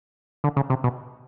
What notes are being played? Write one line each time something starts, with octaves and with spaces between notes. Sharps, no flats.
D3
C#3
C3
B2